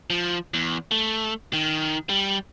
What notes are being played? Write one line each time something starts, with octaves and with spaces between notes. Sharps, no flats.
F3
E2
A3
D#3
G3